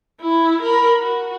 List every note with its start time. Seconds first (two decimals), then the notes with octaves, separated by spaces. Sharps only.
0.21 E4
0.62 A#4 B5
0.99 F#4